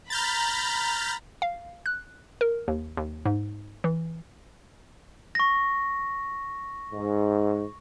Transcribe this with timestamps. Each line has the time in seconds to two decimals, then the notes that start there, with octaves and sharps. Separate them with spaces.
0.10 A#5 B5 F6 G6 A6
1.42 F5
1.86 F#6
2.41 A#4
2.68 D#2
2.97 D#2
3.25 G#2
3.84 E3
5.35 C#6 A#6
6.92 G#2